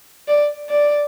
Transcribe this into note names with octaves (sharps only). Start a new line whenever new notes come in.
D5
D5